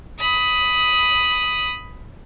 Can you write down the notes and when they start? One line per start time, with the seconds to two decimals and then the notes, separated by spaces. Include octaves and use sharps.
0.20 B5 D#6